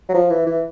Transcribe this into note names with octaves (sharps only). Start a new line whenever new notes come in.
F#3
F3
E3
E3